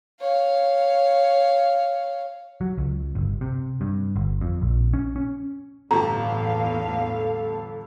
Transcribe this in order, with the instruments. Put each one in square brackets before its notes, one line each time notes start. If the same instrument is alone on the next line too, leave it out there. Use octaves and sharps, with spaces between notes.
[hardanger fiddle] C#5 F5
[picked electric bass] F#3
C#2
G1
C3
G2
G1
F2
A#1
C#4
C#4
[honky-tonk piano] G1 G4 A5 [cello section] E2 A2 F5 [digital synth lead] A4 [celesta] A#5